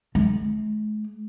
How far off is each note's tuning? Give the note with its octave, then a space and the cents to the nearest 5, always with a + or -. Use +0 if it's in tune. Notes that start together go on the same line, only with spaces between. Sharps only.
G#3 +45